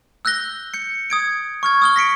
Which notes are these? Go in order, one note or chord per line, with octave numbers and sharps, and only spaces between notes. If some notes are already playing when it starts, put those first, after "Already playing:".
E6 F#6 G6 A#6 G7
G6 C#7
D#6 G#6 D7
C#6 F6 G#6
D#6 F6 G7
A#6 B6 C#7 D7